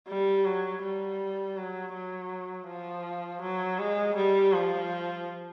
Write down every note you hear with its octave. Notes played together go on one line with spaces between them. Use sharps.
G3
F#3
G3
F#3
F#3
F3
F#3
G#3
G3
F3